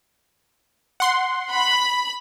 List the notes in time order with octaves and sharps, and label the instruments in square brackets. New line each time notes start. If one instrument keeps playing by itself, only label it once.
[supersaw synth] F#5 C6
[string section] B5